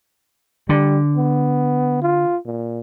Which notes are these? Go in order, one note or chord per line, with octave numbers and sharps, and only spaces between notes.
D3 G3
B3
F4
A#2